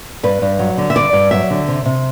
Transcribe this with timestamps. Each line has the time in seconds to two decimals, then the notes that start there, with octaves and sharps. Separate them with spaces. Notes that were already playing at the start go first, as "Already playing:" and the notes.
0.23 G2 B4
0.42 G2
0.59 F#3
0.78 D3
0.90 E5
0.96 G2 D5
1.13 G2
1.31 F#3 E5
1.50 D3
1.68 C3
1.86 C3